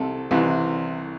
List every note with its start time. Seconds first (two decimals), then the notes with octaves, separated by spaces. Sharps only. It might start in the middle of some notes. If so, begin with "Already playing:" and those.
Already playing: C2 C3 A4
0.31 C2 C3 E3